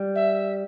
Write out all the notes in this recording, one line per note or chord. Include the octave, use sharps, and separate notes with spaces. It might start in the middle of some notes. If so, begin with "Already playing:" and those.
Already playing: G3
E5